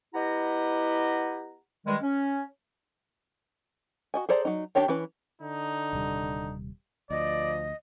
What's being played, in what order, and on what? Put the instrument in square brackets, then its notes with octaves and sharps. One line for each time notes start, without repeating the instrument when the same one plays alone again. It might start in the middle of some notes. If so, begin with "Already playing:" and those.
[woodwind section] B3 E4 G4 D#5 F#5 A#5
G2 D#3 G3 G#3
C#4
[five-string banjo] F#4 D#5 G#5
G#4 A4 C5 D5 A#5
F#3 D#4
D#3 D4 G4 C#5 G5
E3 C#4 B4
[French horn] D3 [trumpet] D#4
[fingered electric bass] D#1 C3 G3
[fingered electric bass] D2 [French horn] F3 [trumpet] D5 [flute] D#5